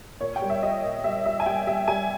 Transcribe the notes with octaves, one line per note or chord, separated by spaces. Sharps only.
A#2 C#5
G5
G3
E5
G3 D#5
A#2
G3 E5
G3 E5
G#5
G3 G5
G3 E5
G3 G#5